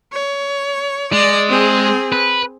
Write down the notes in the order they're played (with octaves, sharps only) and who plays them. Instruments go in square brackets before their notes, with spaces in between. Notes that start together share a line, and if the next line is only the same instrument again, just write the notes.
[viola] C#5
[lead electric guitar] G#3 [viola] D5
[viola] C4 G#4
[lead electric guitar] B4